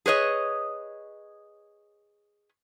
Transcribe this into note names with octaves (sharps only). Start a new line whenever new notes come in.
G#4 B4 C#5 D#5